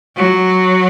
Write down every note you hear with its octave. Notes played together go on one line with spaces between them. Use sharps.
F#3